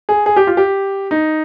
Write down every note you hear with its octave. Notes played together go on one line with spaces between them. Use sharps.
G#4
G#4
G4
F4
G4
D#4